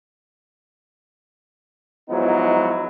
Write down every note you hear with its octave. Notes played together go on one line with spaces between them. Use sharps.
G#2 F3 F#3 B3 D#4 E4